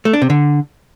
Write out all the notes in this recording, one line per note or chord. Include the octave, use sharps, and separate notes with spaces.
A3
D4
C3
D3